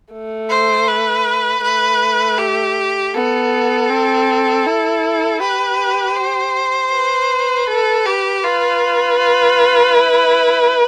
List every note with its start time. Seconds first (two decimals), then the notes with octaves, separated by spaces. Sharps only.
0.13 A3
0.50 C5
0.88 B4
1.63 A3 B4
2.39 G4
3.14 B3 A4
3.90 C4
4.66 E4
5.41 G4 B4
6.16 C5
6.93 B4
7.68 A4
8.06 G4
8.43 F4 B4
9.19 F4
9.95 E4